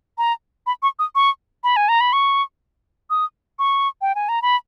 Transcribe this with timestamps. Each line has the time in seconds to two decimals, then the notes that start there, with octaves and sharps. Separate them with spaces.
0.18 A#5
0.67 B5
0.83 C#6
0.99 D#6
1.15 C#6
1.64 B5
1.76 G#5
1.89 A#5
2.01 B5
2.13 C#6
3.10 D#6
3.59 C#6
4.01 G5
4.15 G#5
4.29 A#5
4.42 B5